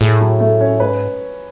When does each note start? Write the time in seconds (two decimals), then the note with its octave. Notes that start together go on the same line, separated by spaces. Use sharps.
0.01 A2 G#4
0.21 F#3
0.40 A3
0.61 C#4
0.80 G#2 B4